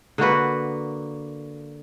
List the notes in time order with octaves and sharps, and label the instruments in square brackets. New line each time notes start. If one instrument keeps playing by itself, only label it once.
[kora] D3 A#3 F#4 B4